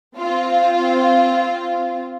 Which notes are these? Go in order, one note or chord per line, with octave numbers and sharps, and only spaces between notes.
C4 F4